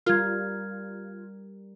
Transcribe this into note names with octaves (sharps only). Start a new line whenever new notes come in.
G3 F4 A#4 F6 G#6